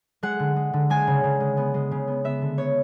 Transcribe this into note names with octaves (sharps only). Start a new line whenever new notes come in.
G#3 F#5
D3
G#3
D3
G#3 G#5
C#3
C#3
G#3
B3
G#3
C#3
B3
B3 E5
D3
B3 C#5